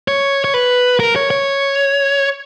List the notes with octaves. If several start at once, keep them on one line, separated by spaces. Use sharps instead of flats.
C#5
C#5
B4
A#4
C#5
C#5